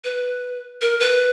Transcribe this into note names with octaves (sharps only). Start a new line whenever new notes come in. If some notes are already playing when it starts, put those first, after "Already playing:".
B4
A#4
B4